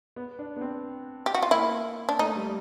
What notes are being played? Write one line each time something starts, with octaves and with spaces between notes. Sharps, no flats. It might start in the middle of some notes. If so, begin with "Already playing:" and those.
B3
D4
B3
C4
G4
F#4
F4
A#3 E4
D4
A3 D#4
G3